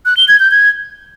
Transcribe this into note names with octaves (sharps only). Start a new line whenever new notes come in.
F#6
G7
G#6
G6
G#6